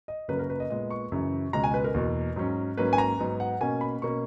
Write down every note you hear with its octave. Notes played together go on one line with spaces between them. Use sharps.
D#5
F#2 C#3 F#3 A#3 C#4 B4
A#4
B4
D#5
A#2 G#3 B3 D#5
C#6
F#2 C#3 E3
C#2 B2 G#3 C#4 A#5
G#5
B4
A#4
E2 B2 A#3
G#2 F#3 C#4
G#2 F#3 A#3 C#4 B4
G#5
A#5
G#2 F#3 B3
F#5
B2 A#3 C#4 G#5
B5
B2 A#3 C#4 C#6